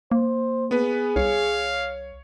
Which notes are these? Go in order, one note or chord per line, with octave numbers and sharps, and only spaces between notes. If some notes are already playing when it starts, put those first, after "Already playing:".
A#3 C5
B3 G#4 B4
C2 C#5 F5